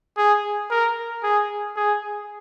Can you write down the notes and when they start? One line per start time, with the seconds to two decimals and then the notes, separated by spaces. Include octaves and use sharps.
0.17 G#4
0.71 A#4
1.24 G#4
1.77 G#4